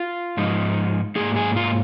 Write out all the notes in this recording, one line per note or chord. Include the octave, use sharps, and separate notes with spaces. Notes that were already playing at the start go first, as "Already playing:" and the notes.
Already playing: F4
G#2 F3 G#3 D#4
G#2 F3 A#3 G#4
G#4
F4